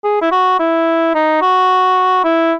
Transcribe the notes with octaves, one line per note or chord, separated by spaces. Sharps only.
G#4
E4
F#4
E4
D#4
F#4
E4